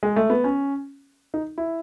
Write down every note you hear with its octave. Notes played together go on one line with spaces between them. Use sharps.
G#3
A3
B3
C#4
D#4
E4